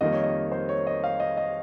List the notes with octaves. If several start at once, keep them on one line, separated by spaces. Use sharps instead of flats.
F2 D#3 G3 A#3 D#5
C#5
D#5
C5
C#5
D#5
F5
D#5
D#5